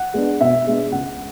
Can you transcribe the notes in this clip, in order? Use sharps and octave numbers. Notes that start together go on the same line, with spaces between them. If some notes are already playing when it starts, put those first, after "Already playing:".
Already playing: F#5
G#3 B3 D4
B2 E5
G#3 B3 D4
C#2 F#5